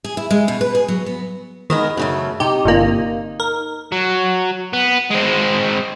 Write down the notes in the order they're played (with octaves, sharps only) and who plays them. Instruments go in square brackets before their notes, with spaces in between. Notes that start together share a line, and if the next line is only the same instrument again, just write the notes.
[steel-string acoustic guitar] G#4
E4
G#3
B2
B4
G#4
F#3
B3
[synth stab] D#3 [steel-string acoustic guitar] G#3 B3 A#4
[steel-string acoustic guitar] F#2 C#3 A3
[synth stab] C3 G4 [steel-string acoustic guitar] D#4
[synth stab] G1 C3 A#3
A#4
[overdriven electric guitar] F#3
B3
G#3 C4